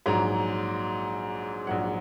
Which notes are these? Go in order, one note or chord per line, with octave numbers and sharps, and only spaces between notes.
A#1 G#2 F#3 A#5
A#1 G#2 F#3 F#5